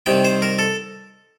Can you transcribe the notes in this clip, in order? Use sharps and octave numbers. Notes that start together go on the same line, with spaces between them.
C2 C3 D#3 G5
C5
A#4
A4